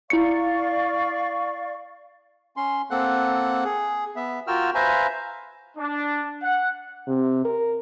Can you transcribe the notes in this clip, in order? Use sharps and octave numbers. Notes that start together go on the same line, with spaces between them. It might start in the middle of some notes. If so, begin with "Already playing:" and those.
E4 D5 F5 C#6 C#7
C#4 C6
A#3 C4 A4 F#5 F#6
G#4
B3 E5
F4 F#4 A#4 G5 E6 F6
B4 C5 E5 F5 G#5 A#5
D4
F#5
C3
A#4